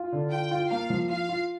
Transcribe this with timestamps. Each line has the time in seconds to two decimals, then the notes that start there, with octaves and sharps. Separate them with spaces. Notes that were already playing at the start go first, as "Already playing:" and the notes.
Already playing: F4
0.12 D3
0.31 F4 G5
0.51 F4
0.70 A#3 F5
0.90 F3
1.09 F4 F5
1.29 F4